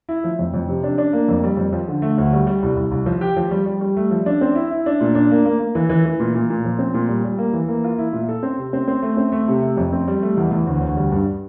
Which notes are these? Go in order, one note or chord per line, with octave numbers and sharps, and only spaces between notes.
E4
F3
F2
F2
C3
D4
D4
A#3
F2
G3
F2
F3
D3
A3
D2
G3
G3
C2
C2
C2
F3
G4
F3
G3
G3
G3
A3
F3
D4
C4
E4
E4
D4
A#2
D4
A#3
A#3
A#3
E3
E3
E3
A#2
A#2
A#2
F3
C4
A#2
G3
G3
A#3
E3
A#3
F4
E4
A#2
A4
C4
C3
C4
C4
A3
C4
A3
C3
A3
F2
C4
G3
A3
E2
E2
D2
D2
G3
G2